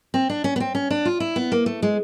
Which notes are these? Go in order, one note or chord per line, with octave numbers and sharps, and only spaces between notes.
C4
D4
C#4
B3
C4
C#4
D4
F4
E4
B3
A#3
A3
G#3